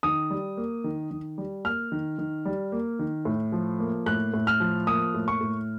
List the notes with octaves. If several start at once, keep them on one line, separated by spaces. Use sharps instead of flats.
D#3 D#6
G3
A#3
D#3
D#3
G3
A#3 F6
D#3
D#3
G3
A#3
D#3
A2
F3
A#3
A2 F#6
A2
F6
F3
A#3 D#6
A2
C#6
A2